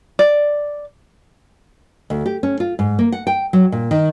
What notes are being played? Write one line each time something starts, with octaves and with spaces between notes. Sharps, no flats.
D5
D2
G4
C#4
F4
G#2
A#3
F#5
G5
F#3
A#2
D#3